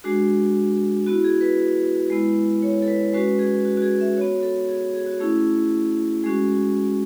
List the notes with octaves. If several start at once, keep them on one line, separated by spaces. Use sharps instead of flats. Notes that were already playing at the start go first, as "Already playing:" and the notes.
G#3 D4 F#4 G#4
B3 E4 F#4
G#4
B4
G#3 B3 E4
C#5
A4
B4
G#3 C#4 F#4 B4
G#4
F#4
F#4
G#4
E5
B3 F#4 C#5
A4
G#4
G#4
F#4
A3 C#4 E4 G#4
G#3 C#4 F#4 G#4